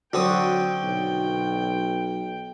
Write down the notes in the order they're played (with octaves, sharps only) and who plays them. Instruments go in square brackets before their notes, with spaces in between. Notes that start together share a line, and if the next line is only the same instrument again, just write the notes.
[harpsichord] D3 C4 D#6 [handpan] F#3 F#4 [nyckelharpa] G5
[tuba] B1